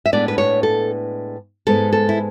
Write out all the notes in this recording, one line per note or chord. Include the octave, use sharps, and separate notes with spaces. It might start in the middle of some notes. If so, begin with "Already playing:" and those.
E5
A2 G#3 B3 D4 D5
B4
C#5
A4
G#2 G#3 B3 A4
A4
E4